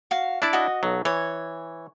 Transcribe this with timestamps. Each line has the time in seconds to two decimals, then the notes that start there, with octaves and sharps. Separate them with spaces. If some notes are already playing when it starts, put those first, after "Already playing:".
0.11 F#4 F5
0.42 D4 E4 D5 A5
0.53 F#4 D#5
0.83 B1 F#3
1.05 E3 C#5